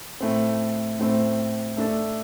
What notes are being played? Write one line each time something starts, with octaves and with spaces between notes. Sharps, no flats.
A2 A3 C4
A2 A3 C4
A3 D4 A4